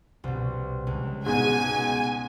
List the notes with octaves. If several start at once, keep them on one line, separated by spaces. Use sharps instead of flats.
C2 B2
C#2
G#2 B2 G#5